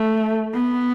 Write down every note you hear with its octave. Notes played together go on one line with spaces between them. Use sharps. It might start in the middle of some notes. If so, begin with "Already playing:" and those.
Already playing: A3
B3